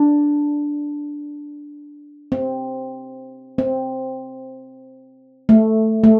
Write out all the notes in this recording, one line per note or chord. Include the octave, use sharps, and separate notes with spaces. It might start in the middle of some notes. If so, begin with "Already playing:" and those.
Already playing: D4
C4
C4
A3
A3